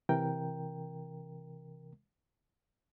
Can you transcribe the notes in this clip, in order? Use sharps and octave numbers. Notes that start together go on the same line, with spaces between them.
C3 E3 A#4 G5